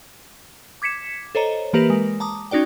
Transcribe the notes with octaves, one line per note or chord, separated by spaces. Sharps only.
D6 G#6 B6 C#7 E7
A4 C5 C#5 D#5 A#5
E3 A#3 G4 A#4 B4 A#6
G#3
A5 A#5 D6 D#6
C#4 D#4 F#4 D5 G5